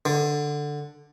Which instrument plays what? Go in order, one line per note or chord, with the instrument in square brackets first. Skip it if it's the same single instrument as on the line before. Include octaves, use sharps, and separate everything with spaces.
[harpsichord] D3